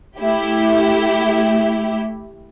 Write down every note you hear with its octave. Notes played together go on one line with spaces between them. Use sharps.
A3 E4 G4